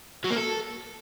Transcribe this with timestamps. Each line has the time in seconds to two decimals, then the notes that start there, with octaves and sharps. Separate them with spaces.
0.24 F#3
0.30 A#3
0.36 A4